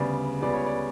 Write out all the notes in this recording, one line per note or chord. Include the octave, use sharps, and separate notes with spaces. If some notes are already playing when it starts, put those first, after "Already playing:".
Already playing: D2 C#3 G3 B3 D5
C#2 C#3 G3 B3 D5
C#5
D5